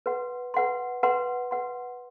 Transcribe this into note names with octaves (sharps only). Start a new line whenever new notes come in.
B4 F#5 C6
B4 F#5 C6
B4 F#5 C6
B4 F#5 C6